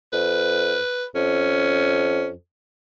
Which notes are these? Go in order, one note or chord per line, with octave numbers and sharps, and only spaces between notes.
F2 B4
F2 C#4